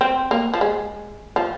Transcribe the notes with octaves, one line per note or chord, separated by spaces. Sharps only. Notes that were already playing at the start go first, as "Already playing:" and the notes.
C4
A#3
F3
G#3
F3